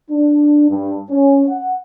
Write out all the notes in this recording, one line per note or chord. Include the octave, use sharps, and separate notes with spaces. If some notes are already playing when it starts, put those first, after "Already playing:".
D4
G2
C#4
F#5